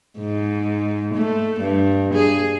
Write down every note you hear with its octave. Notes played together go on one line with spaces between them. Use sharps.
G#2
A3
G2
G#4